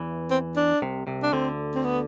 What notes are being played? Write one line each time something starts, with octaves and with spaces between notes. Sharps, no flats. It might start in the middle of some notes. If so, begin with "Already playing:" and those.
Already playing: E2 E3
C4
D4
C2 C3
C2 C3
D4
D2 D3 C4
C4
B3